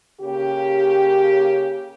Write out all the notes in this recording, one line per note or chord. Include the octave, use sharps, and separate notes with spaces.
C#3 A#3 C#4 G4